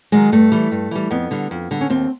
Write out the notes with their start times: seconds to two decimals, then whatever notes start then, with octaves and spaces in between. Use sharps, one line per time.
0.12 D#3 F#3 G#3
0.32 G2 A3
0.52 E3 G3
0.71 G2
0.91 E3 G3
1.11 F2 B3
1.31 D3 G3
1.51 F2
1.71 D3 G3
1.81 C#4
1.90 D#2 C4